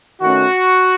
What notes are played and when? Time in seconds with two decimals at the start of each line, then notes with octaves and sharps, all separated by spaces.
0.21 D#3 A3 C#4 F#4